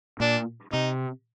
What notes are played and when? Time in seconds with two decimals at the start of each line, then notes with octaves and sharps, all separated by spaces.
0.20 A#2 D4
0.73 C3 D#4